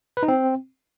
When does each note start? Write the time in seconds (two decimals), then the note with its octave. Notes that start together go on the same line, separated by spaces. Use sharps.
0.17 B4
0.23 D#4
0.28 C4